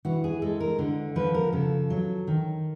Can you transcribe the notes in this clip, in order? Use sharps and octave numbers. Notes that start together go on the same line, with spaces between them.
E3 F#4
G#4
G#3 A4
A#4
D3
F3 B4
A#4
C#3 A4
F#3
D#3